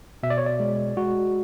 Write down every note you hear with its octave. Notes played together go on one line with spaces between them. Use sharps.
B2 E5
D5
C#5
D5
G#3
G#3 F#4